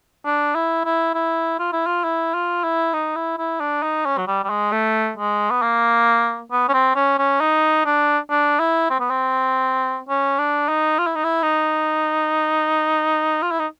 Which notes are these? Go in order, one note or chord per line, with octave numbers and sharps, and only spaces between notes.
D4
E4
E4
E4
F4
E4
F4
E4
F4
E4
D#4
E4
E4
D4
D#4
C#4
F#3
G3
G3
G#3
A3
G#3
B3
A#3
B3
C#4
C4
C#4
C#4
D#4
D4
D4
E4
C4
B3
C4
C#4
D4
D#4
F4
E4
D#4
E4
D#4
F4
E4
D#4